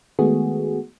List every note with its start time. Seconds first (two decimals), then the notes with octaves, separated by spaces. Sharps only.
0.19 D#3 G#3 A3 B3 F#4 G#4